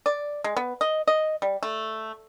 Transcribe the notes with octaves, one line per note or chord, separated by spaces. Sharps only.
D5
G#3
B3
D#5
D#5
G3
A3